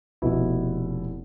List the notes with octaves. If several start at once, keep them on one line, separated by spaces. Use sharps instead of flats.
F1 B2 E4